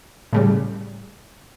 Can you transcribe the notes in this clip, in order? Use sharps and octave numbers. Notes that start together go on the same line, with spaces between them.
A2 C#3 G3